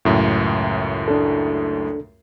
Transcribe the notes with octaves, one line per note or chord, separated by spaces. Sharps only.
C#2 F#2 A2
D4 A4